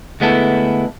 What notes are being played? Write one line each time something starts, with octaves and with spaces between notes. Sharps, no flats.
D2 G#3 B3 E4 A4